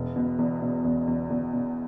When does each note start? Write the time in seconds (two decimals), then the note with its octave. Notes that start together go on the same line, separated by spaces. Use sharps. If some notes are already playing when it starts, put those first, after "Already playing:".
Already playing: E1
0.16 B2
0.38 E2
0.62 B2
0.84 E2
1.07 E2
1.30 E2
1.53 B2